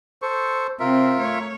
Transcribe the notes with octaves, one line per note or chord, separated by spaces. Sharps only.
A4 C5 C#6
C3 C4 F4 A#4 E5
A3 C#5